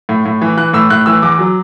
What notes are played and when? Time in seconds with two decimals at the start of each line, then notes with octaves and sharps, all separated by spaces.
0.09 A2
0.25 A2
0.42 E3
0.57 E3 F#6
0.73 A2 E6
0.90 A2 F#6
1.06 E3 E6
1.22 E2 D6
1.39 F#3